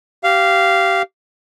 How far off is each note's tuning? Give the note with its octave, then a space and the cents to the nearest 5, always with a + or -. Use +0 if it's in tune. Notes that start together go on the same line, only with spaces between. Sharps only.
G4 -20 F5 -10